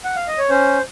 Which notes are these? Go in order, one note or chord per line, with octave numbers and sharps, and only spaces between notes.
F#5
F5
D#5
C#5
C#4 C5